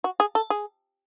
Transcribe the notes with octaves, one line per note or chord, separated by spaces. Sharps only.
F#4
G#4
A4
G#4